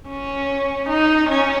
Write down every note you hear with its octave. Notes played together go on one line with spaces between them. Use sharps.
C#4
D#4
C#4